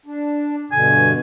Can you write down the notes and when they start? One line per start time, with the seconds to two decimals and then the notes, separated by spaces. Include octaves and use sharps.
0.06 D4
0.72 G2 B2 D3 G#5